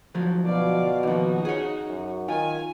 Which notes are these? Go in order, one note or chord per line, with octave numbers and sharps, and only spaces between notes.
D2 F3 F#3
B2 D5 F5
D#2 F3 D#4 F#4
G#4 C#5
F#2
D#3 F4 G#5